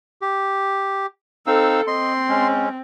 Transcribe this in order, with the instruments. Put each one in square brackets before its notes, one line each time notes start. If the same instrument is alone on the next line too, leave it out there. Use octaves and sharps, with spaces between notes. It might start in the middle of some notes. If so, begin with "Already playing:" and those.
[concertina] G4
[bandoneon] C4 D#4 E6 [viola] A4 [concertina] F5
[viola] C4 [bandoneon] D#5 [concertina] C6
[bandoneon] G#3 C#4